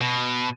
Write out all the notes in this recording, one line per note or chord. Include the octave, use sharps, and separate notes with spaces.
B2